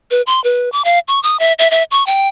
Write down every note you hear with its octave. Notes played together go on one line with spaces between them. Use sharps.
B4
C6
B4
D6
F5
C#6
D#6
E5
E5
E5
C#6
G5